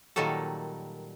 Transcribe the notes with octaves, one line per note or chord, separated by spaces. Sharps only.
A#2 D#3 F#3 G3 A4